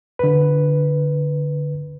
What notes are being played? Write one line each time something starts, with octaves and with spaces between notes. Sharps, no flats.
D3 B4